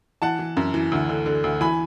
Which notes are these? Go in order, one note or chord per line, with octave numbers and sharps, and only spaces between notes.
E3 F#5 A5
E3
F#2
E3
D2
D3
D3
D2
E3 G#5 B5